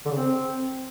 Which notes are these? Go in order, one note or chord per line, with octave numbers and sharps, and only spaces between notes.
D3
C#3
C4